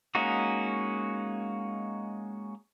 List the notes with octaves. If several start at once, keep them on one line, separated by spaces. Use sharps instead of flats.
G#3 A#3 C#4 D#4 F#4